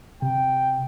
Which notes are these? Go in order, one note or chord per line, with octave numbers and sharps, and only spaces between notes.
C3 G5